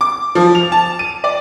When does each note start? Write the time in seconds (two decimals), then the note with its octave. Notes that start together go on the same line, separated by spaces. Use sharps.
0.01 D6
0.35 F3
0.55 F7
0.72 A5
0.99 D#7
1.24 D5